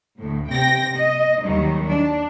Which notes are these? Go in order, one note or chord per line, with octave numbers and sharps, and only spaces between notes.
D2 A2
C3 G5 A#6
D#5
D#2 D#3 F#3 G3
D4